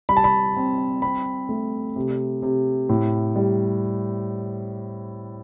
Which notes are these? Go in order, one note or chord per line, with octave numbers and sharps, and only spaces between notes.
G3 B5
A5
B5
C4
C4 B5
A3
C3
C3
A2
G3